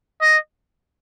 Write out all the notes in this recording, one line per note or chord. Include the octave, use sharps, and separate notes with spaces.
D#5